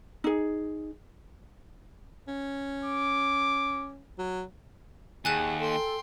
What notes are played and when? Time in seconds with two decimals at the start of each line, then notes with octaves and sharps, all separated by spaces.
0.24 D#4 G#4
2.28 C#4
2.85 D6
4.18 F#3
5.25 D#2 G#4 F#5 G#5 A5 F#6 E7
5.59 A4 G5 C6